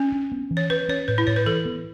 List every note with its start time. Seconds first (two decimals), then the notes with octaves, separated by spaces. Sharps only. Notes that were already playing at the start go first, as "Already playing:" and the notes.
Already playing: C#4
0.12 D4
0.32 B3
0.51 E3
0.57 C#5
0.70 C#4 B4
0.89 C#4 C#5
1.08 A2 B4
1.18 E4
1.27 A2 C#5
1.36 B4
1.46 E3 A4
1.65 B3